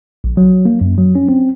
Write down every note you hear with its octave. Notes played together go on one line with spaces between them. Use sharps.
A#1
F#3
A#3
F#2
F#3
C#4
C4